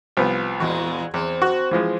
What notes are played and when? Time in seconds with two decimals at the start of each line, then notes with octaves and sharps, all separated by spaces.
0.17 C2 F3 B3
0.60 E2 A#2 G#3 F#4
1.14 E2 C4
1.42 F#4
1.71 E3 F3 G#3